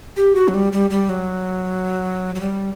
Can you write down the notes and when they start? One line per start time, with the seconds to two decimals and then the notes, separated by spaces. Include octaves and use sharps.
0.17 G4
0.35 F#4
0.48 F#3
0.54 G3
0.72 G3
0.90 G3
1.09 F#3
2.35 F#3
2.41 G3